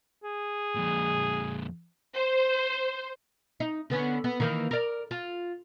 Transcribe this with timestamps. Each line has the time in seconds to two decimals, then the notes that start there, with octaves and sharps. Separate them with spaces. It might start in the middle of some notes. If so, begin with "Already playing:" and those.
0.23 G#4
0.76 F2 A#2
2.14 C5
3.60 D#4
3.90 D3 B3 C#4
4.24 B3
4.40 D#3 E3 A#3
4.71 A#4 D5
5.11 F4